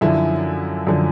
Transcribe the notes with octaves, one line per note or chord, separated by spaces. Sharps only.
F#2 D3 F3 E4
F#2 D3 F3